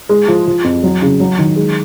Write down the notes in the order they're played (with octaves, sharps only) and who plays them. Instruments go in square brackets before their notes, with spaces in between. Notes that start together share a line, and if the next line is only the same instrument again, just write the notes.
[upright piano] G#3
F3
F3
F2
F#3
C#3
F#3
D#3
G#3